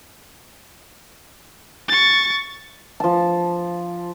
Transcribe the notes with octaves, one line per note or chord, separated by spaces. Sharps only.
C#6 A6
F3 A5